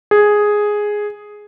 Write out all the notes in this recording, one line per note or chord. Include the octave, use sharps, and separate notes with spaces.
G#4